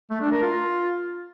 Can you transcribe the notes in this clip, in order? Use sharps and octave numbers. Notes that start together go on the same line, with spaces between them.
A3
D4
A#4
F4